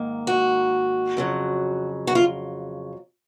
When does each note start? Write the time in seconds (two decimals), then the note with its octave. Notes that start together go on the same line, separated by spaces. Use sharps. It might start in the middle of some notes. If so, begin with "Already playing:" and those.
Already playing: G#2 D#3 A#3
0.27 F#4
1.17 F2 C#3 F#3
2.07 F#4
2.15 F4